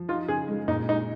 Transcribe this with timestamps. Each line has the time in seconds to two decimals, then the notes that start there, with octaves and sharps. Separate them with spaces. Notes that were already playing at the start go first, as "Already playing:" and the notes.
Already playing: F3
0.09 D#4 F4
0.28 C#3 G#4
0.48 G#3
0.68 A#2 D#4
0.89 G#3 D#4